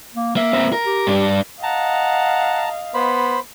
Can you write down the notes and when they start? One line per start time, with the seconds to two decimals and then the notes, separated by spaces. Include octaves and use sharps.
0.15 A#3
0.36 A#3 E5
0.53 A#3 C4
0.73 A#4
0.85 G4
1.07 G2 D4
1.63 D#5 F5 F#5 A5 A#5
2.94 B3 C5 B5